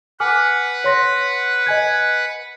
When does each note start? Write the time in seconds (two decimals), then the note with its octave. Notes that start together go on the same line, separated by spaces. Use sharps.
0.20 B4 F#5 G#5 D6 F6
0.84 C#5 C6 A#6
1.66 D#5 G#5 G#6